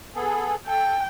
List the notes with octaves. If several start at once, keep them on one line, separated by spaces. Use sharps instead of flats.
B3 G#4 A4
A4 G5